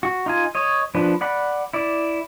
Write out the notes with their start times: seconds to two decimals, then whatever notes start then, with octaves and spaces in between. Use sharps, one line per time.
0.03 F#4
0.26 D#4 F4 G#5
0.55 C#5 D#5
0.95 F3 D4 B4
1.21 D5 F#5 B5
1.73 E4 D5